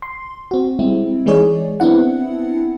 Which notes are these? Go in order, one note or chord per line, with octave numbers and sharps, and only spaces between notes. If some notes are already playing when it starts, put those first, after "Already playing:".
C6
C4 F#4
G3 G#3 C4 E4
E3 G#3 D#4 G#4 C#5 D5
B3 C4 D4 E4 F#5